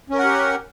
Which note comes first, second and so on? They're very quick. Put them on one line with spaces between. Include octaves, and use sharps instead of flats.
C#4 A#4 F#5 G4